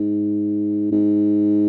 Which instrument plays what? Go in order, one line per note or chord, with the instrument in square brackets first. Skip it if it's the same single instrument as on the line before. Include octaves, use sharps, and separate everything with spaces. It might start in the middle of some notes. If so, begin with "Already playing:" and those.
Already playing: [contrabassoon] G#2
G#2